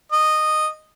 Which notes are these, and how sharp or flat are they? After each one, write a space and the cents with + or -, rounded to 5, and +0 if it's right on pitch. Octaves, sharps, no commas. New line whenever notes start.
D#5 -10